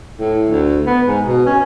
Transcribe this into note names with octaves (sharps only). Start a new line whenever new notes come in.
A2
D2
B3
G#2
B2
C#4